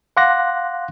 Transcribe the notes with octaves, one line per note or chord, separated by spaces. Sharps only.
F5 F#5 C6 D6 F#6 A#6